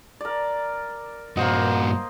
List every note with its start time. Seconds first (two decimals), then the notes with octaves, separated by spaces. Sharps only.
0.21 A#4 D5
1.37 G2 A#2 A#3 F#4 C5 D#5